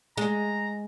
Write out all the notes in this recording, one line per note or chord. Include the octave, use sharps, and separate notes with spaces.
G#3 A#5